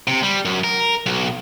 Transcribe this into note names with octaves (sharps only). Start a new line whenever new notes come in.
C3
G3
F#2
A#4
B1